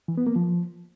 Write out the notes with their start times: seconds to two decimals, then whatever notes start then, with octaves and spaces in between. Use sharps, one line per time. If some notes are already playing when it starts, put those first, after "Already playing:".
0.08 E3
0.17 B3
0.27 A#3
0.36 F3